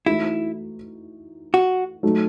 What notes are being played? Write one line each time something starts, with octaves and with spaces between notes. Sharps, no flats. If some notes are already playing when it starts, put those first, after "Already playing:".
E3 A3 D#4 E4 F#4
F#4
F#3 A3 D#4